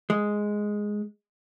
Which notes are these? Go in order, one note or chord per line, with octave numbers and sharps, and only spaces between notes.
G#3